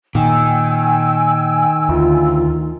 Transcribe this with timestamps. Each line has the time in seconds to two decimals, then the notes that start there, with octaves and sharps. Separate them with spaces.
0.15 A#2 D#3 G5 G#5 E6
1.89 D2 F4